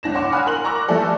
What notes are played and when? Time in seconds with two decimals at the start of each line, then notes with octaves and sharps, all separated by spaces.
0.03 G1 C#2 D4 A#6 E7
0.14 C#5 F5 F#5 C6 D6
0.32 F#5 G#5 B5 D#6 F6 F#6
0.47 A#4 C6 F#7
0.64 A#5 C#6 D6 E6 F#6 A#6
0.88 E3 F3 G3 A3 A4 D5